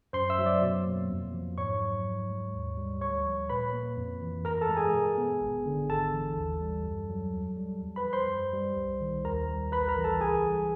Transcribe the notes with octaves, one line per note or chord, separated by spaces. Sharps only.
F#2 C5 C6
E5 E6
F#3
D5 D6
B2
A#3
F2
F3
G#2 C#5 C#6
F#3
G#2
G#3
D#2
G3
D2 C#5 C#6
F3
A#2 B4 B5
A#3
F2
E3
G2 A#4 A#5
A4 A5
G#3
G#4 G#5
B2
B3
G#1
D3
G#1 A4 A5
E3
D#2
G3
F#2
F#3
E2
G3
E2
B4 B5
F3
C5 C6
F#2
G3
C2
D#3
D#2 A#4 A#5
G3
A#1 B4 B5
A#4 A#5
E3
A4 A5
C#2 G#4 G#5
G3